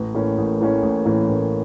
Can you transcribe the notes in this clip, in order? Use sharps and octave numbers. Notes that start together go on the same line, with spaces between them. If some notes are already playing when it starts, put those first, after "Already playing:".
Already playing: A1
A2 E3 A#3 C#4
A1
A2 E3 A#3 C#4
A1
A2 E3 A#3 C#4
A1